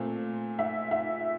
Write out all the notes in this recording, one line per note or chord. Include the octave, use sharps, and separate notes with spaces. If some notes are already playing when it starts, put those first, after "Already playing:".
Already playing: A#2 A3 C4
E5
E5